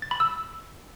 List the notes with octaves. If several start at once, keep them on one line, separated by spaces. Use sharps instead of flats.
A6
B5
E6